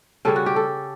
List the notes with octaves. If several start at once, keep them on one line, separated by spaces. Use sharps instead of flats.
C#3 G3 C#4 A4
F#4
G4
A4